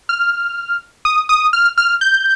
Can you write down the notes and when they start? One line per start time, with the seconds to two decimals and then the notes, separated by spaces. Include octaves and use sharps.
0.09 F6
1.05 D#6
1.29 D#6
1.53 F6
1.78 F6
2.01 G6